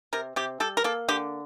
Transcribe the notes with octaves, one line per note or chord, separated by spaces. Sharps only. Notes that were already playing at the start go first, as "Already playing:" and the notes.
C3 A#4
C3 G4
G3 A4
A#4
A#3 A4
D3 G4